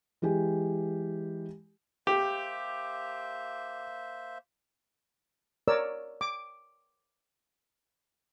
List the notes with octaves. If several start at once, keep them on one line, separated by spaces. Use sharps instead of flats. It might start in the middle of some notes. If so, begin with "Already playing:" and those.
E3 G#3 G4 G#5
A#3 G4 C5 E5
A#4 C#5 D5 E6
D6